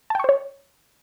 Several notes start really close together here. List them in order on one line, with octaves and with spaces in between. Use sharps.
A5 G5 C#6 C5 C#5